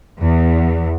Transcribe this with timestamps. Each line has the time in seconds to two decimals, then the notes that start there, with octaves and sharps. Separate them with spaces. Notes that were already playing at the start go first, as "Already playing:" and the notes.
0.21 E2